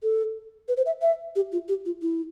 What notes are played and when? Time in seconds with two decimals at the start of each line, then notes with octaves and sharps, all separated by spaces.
0.03 A4
0.68 B4
0.77 C5
0.86 E5
1.02 E5
1.35 G4
1.52 F4
1.68 G4
1.85 F4
2.02 E4